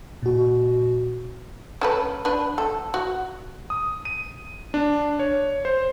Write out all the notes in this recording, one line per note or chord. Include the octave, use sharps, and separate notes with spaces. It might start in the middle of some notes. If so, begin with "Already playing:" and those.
A#2 F#4
C#4 A4 B4
D4 B4
A4
F#4
D#6
D#7
D4
C#5
C5